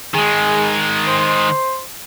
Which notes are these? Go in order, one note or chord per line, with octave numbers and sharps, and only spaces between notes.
D#3 G#3 G#4
C5